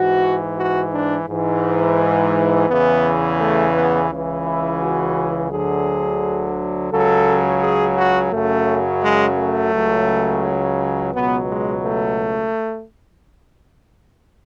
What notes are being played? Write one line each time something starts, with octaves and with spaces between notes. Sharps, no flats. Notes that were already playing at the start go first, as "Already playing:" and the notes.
Already playing: G#2 E3 F#4
F#4
D4
G#2 E3
E2 C#3 E3 B3
A3
B3
C#2 C#3 E3
E4
F#4
D2 D3 F#3 G#4
C#2 C#3 F#3 A4
G#4
F#4
F#2 C#3 F#3 A3
G#3
A3
C#2 C#3 F#3
C#2 B2 F#3 B3
G#3
A3